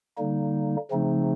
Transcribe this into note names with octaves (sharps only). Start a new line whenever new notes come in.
D3 G3 A#3 D#4
C#3 F3 A3 C4 D#4